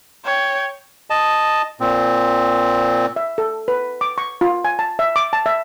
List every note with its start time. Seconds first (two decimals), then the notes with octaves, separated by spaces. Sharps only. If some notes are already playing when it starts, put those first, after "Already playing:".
0.25 C#5 G5
1.10 D#5 A5
1.80 A#2 C4
3.16 E5
3.38 A4
3.68 B4
4.01 D6
4.18 C#6
4.41 F4
4.65 G#5
4.79 A5
4.99 E5
5.16 D6
5.33 A5
5.46 E5